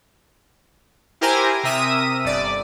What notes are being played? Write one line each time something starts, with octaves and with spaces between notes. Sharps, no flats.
E4 G4 A#4 C5 G#5 A#5
C3 A#4 E5 D#6 D#7
G1 D5